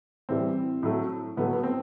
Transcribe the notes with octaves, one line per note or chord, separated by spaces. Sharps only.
A2 E3 G3 C4
A2 F#3 A3
A2 F#3 A3 B3
B3
C4